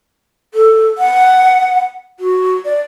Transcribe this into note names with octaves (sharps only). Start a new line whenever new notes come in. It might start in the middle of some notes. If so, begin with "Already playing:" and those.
A4
F#5
F#4
D5